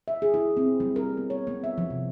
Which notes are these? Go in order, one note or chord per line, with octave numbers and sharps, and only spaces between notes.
E5
G#4
E4
C4
G3
A#4
B3
C#5
B3
E5
F3
C3